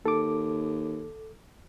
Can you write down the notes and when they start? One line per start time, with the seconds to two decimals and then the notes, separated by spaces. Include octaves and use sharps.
0.05 D#2 A4 D6